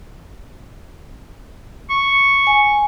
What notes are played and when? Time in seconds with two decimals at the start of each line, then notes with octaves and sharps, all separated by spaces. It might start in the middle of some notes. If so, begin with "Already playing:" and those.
1.90 C#6
2.47 G#5